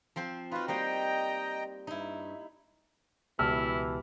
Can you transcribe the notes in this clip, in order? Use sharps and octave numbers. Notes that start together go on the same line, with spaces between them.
F3 C4 C5
D#4 F4 F#4 B4
G3 A#3 C5 D#5 G5 A#5
G2 D#4 E4
C#2 B2 E3 E4 G4 A5 E6 F6